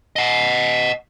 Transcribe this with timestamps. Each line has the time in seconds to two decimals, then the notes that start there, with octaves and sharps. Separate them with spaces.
0.16 D#5 F#5